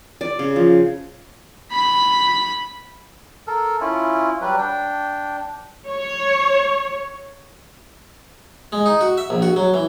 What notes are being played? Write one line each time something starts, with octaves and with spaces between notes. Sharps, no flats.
D5
C#3
F3
B5 B6
A4 A#4
C#4 E4 F4
F#3 G3 B4
D4 G5
C#5
G#3
D#4
F#4
E5
A#1
F#4
F#3
E3